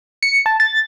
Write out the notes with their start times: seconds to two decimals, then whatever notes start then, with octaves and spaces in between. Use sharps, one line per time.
0.23 C#7
0.46 A5
0.60 A6